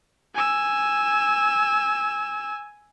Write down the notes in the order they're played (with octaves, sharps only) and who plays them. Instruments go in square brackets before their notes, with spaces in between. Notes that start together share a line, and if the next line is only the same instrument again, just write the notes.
[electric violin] G#5 E6